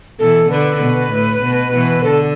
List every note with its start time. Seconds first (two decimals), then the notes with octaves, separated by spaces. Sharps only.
0.19 B2 E3 A4
0.50 D3 B4
0.80 B2
1.12 A2
1.42 B2
1.73 B2 E3
2.04 D3 A4